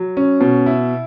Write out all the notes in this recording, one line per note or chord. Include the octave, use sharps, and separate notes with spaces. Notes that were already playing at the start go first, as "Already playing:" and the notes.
Already playing: F#3
C#4
B2
E4